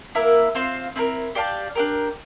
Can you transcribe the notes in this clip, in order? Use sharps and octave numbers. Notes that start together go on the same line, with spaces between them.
A#3 E4 A#4 E5
C4 F4 C5 F5
C4 E4 A#4
G4 D5 F5 A5
D4 G4 A#4